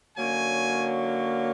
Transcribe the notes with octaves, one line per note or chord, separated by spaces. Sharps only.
D3 F#3 A#3 C#4 G#5